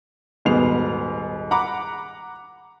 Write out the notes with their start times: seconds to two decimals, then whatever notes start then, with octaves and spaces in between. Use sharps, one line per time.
0.45 D#1 G#2 B2 B3 C7 F7
1.51 F#5 A#5 B5 D6